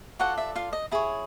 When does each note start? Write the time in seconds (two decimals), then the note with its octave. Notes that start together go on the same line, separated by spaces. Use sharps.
0.19 F4 F#4 A4 D5 F#5
0.38 E5
0.55 F4 F5
0.73 D#5
0.91 E4 G#4 C#5